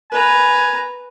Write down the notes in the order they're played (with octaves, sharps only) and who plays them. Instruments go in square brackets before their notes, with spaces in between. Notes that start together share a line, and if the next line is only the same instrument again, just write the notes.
[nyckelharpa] B4 A#5 [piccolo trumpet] G#5